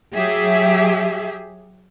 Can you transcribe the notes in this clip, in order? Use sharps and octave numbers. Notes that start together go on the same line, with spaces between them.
F#3 G4 G#4 E5